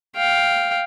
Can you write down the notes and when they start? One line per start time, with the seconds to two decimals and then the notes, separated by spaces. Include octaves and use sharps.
0.16 F5 G5